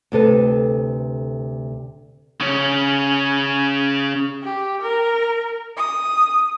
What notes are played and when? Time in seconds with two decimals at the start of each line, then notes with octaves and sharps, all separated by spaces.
0.12 D2 C3 A4 B4
2.40 C#3 C#4
4.43 G4
4.82 A#4
5.77 D#6